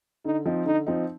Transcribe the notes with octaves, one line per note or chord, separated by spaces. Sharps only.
D3 D#4
F3 C4 D#4
D3 D#4
F3 C4 D#4